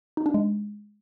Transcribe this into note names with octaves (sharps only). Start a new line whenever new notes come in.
D#4
D4
G#3